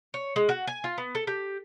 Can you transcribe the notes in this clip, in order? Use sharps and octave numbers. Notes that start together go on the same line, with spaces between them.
C#5
G#3
F#4
G#5
F4
B3
A4
G4